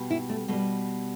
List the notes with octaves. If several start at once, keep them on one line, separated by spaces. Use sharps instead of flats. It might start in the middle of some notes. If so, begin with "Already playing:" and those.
Already playing: B2 G3
E4
A3
B2 G3 A3